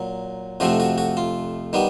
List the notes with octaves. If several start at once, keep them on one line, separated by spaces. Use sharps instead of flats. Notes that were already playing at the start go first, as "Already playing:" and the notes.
Already playing: A#2 F#3
F2 C3 F3 A3 F#4
F#4
F#4
F4
D#3 G3 B3